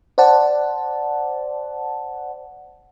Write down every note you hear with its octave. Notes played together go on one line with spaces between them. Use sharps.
C5 D5 F#5 A5